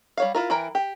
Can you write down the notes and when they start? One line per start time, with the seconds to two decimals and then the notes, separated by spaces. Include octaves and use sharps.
0.17 G3 C#5 F5
0.35 E4 F4 A#4
0.50 E3 A#4 G5
0.75 G4